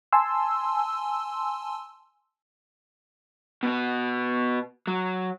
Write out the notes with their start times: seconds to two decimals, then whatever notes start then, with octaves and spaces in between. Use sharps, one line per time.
0.13 G#5 A5 C6 E6
3.63 B2 B3
4.87 F#3